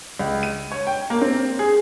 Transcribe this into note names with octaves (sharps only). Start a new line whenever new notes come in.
C#2
D#7
C#5
G5
A#3
C4
G#4